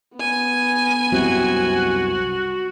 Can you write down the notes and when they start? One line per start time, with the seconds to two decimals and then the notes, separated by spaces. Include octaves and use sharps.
0.16 B3 G#5
1.12 C2 F#2 C3 F#4